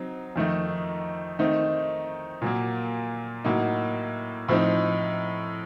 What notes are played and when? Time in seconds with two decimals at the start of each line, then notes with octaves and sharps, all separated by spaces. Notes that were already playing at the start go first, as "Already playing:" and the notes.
Already playing: F#3 C4 D#4
0.36 F2 D#3 A3 D#4
1.39 D#3 A3 C4 D#4
2.42 A#2 F#3 A#3
3.45 A2 F#3 A#3 D#4
4.48 A2 F3 C4 D#4